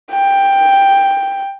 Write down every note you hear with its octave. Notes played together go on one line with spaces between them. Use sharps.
G5